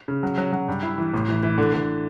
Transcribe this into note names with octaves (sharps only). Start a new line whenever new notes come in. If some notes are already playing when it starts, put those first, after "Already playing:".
C#3
F#3
F#3
F#3
G2
E4
E3
A1
E3
E3
D3
D3